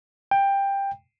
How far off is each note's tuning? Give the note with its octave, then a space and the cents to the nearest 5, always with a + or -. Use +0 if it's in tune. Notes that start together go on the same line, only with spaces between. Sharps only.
G5 +15